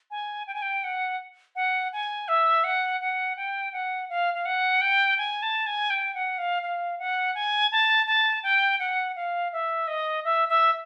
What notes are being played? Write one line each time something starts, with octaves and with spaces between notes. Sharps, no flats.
G#5
G5
G#5
G5
F#5
F#5
G#5
E5
F#5
F#5
G5
F#5
F5
F5
F#5
G5
G#5
A5
G#5
G5
F#5
F5
F5
F#5
G#5
A5
A5
G5
F#5
F5
E5
D#5
E5
E5